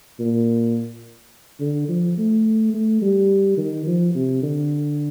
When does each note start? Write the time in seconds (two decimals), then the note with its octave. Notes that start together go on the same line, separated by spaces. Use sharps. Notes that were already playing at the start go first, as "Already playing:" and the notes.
0.20 A#2
1.60 D3
1.88 F3
2.18 A3
2.74 A3
3.02 G3
3.57 D#3
3.87 F3
4.15 C3
4.43 D3